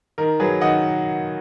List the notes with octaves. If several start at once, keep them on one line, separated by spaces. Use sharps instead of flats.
D#3 A#4
F#3 G#4 B4
D#3 D#5 F#5